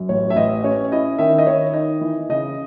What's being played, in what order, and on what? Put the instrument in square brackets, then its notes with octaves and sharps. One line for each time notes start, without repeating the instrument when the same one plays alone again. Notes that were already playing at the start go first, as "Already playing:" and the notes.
Already playing: [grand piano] F#2
A1 C#5
E5
A1 D#5
C#4 C#5
E4 D#5
D#3 E5
D#5
D#3 C#5
D#4 D#5
E3
C#3 D#5